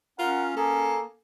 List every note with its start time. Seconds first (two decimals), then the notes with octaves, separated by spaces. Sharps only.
0.19 C#4 F4 A#4 F#5
0.56 A#3 G#4 A4